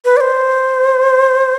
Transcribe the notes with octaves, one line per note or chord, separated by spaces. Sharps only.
B4
D5
C5